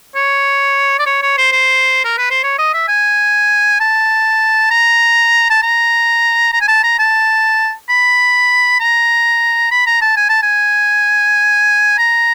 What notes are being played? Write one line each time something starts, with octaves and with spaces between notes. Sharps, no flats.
C#5
D5
C#5
C#5
C5
C5
A#4
B4
C5
C#5
D#5
E5
G#5
A5
A#5
A5
A#5
A#5
G#5
A5
A#5
A5
B5
A#5
B5
A#5
A5
G#5
A5
G#5
A#5